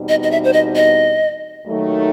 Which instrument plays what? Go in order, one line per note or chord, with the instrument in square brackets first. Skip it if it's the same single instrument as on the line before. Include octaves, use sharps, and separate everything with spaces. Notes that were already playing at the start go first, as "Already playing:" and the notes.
Already playing: [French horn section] E2 B2 G3 C4 D#4
[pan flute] D#5
D#5
E5
C5
D#5
D#5
[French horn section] D#2 D#3 F#3 A3 D#4